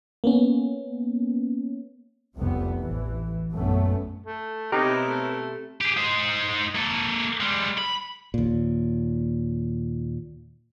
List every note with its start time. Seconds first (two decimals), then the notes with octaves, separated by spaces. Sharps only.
0.24 A#3 B3 C#4
2.38 F1 C2 F2 C3 G3 B3
2.82 A1 E3
3.54 A#1 F#2 A3 B3 C#4
4.26 A3
4.72 B2 C4 D#4 E4 G4 A#4 B4 C#5
5.07 A3
5.81 G4 G#4
5.97 D#4 C5
6.76 A#3 A4
7.40 G3 G#3
7.78 B5
8.34 D#2 A#2